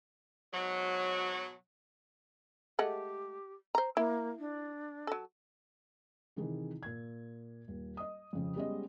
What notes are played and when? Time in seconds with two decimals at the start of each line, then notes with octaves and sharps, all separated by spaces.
0.53 G#2 B2 F#3
2.79 G#3 A3 G4 F#5
3.75 C5 A#5
3.97 A#3 E4
4.39 D4
5.07 F#3 A4
6.36 C3 D#3 E3 G#4
6.83 A#2 G#6
7.68 D#1
7.97 D#5 D#6
8.33 F2 C#3 F3
8.56 G3 G#3 B3 C#4 D#5